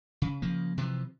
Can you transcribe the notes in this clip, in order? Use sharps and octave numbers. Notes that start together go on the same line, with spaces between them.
C#3
C#3 F3 A#3
C3 E3 F3